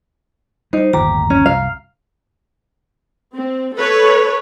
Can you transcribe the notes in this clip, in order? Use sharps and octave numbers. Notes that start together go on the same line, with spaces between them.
G3 D#4 C5
G1 D#2 A2 G4 A#5
C#4
C2 F#2 F5
C4
A4 B4 C#5